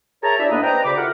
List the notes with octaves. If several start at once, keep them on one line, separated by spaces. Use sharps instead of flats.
G#4 A#4 C#5 E5 A5 A#5
D4 E4 G4 D5 E5
A2 A#3 B3 D4 B4 D#5
B4 C5 D5 D#5 G5 A#5
D2 C#3 C5 D5 B5 D6
E4 F4 G4 A4 A#4 F#5